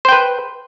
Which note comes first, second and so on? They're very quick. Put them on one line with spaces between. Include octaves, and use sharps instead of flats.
C5 G5 B4